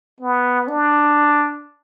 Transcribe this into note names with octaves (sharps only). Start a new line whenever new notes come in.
B3
D4